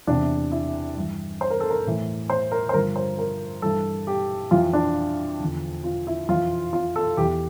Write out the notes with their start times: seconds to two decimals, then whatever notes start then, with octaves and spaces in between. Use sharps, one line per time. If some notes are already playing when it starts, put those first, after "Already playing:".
0.07 E2 C3 E3 D4
0.52 E4
0.97 G2 E3
1.41 C5
1.50 A#4
1.60 A4
1.70 A#4
1.85 A2 E3
2.30 C5
2.51 A#4
2.69 C5
2.74 G2 D3 F3 A#4
2.96 C5
3.19 A#4
3.62 G2 E3 A4
4.07 G4
4.51 F2 E3 F4
4.73 D4
5.40 E2 D3 F3
5.84 F4
6.07 E4
6.29 F2 E3 F4
6.73 F4
6.96 A4
7.17 E2 E3 G4